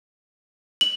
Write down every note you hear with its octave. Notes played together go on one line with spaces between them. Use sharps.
F#7